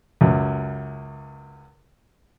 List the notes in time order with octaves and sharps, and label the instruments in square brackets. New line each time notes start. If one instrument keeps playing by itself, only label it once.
[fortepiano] C#2 F#2